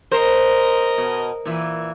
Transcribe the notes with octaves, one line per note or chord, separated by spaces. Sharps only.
A#4 C5 D#5
B2
A#2 E3